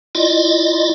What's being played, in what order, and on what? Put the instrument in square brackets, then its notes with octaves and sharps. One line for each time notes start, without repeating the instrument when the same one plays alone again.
[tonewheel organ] E4 F4 D5 D#5